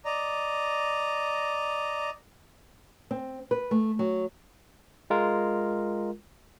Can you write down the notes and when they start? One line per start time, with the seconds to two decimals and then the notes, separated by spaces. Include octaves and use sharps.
0.05 D5 D#5 A#5
3.11 C4
3.51 B4
3.71 A3
3.99 F#3
5.10 G#3 F4 A#4